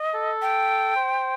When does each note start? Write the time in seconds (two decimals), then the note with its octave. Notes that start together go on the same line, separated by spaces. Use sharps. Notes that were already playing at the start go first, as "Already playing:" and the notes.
Already playing: D#5
0.14 A4
0.42 G5
0.96 C5